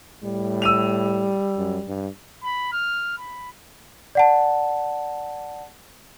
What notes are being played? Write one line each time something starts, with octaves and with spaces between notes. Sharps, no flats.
A2 G3
E6 D#7 F7
F#2
G2
B5
F6
B5
D5 F#5 A5